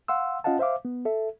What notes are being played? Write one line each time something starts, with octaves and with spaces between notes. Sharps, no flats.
F5 F#5 C6 E6
C#4 F4 D#5 F5 F#5 A5
C5 E5 F5 D6
B3
A4 E5